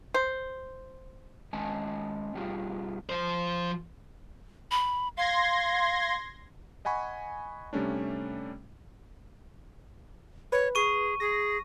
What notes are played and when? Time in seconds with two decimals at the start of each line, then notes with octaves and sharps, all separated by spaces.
0.14 C5
1.53 D#3 G#3 C#4 D#5 G#5 A5
2.34 B2 F#3 G3 F4 G4 G#4
3.09 F3 C5
4.71 B5
5.17 F5 C6 G#6 A#6
6.85 D#5 F#5 G#5 B5 C#6
7.73 C3 G3 A3 C#4 D4
10.52 B4 C#5
10.75 G#4 C#6 D#7
11.20 G#4 A#6